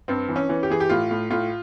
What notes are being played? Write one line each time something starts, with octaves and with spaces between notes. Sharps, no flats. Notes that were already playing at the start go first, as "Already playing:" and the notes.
G2 C4
E3
C#4
E3
G4
E3 G#4
G4
A2 F4
A2
A2 F4